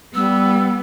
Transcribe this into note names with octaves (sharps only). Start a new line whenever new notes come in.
G3 B3 E6